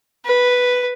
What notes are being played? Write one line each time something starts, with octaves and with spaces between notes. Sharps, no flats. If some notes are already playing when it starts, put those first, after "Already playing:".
B4